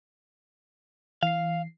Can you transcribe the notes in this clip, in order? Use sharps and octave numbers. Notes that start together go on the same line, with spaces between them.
E3 F5 C7